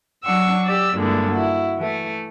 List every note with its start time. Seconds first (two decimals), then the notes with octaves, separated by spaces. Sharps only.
0.24 F#3 D4 F#5 C#6 E6
0.64 G4 D5 E6
0.97 G2 A#2 D3 G#3 E4
1.30 E4 F#4
1.77 E3 A3